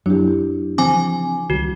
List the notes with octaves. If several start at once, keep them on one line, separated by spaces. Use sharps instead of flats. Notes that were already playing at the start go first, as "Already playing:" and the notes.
F#2 F#3 A#3 C4 D4 E4 G4
C#3 E3 F3 C4 G#5 D6
C#2 D#3 G3 F#4